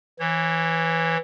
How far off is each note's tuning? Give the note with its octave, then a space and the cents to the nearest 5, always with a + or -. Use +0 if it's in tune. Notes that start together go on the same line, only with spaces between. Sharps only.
E3 +0 C#5 -30